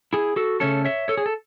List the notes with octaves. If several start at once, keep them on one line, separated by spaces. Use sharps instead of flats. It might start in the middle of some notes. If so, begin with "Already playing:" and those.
E4 G#4
F#4 A4
C#3 E3 A3 C#4 A4 C#5
C#5 E5
A4 C#5
G#4
A4